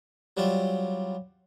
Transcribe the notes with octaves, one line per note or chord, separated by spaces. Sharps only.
F#3 G3 C4 F4